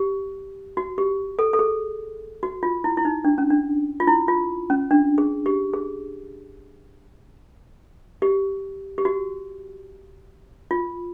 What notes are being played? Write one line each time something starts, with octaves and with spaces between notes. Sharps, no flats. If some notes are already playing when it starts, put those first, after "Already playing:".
Already playing: G4
F#4
G4
A4
A4
G#4
F#4
F4
E4
E4
D#4
D4
C#4
D4
F4
E4
F4
C#4
D4
G#4
G4
G#4
G4
G4
F#4
F4